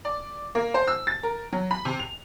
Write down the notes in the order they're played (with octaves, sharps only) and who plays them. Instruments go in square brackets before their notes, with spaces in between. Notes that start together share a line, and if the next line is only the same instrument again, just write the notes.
[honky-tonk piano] D5
A#3
C5
E6
A6
A#4
F#3
B5
C3
F7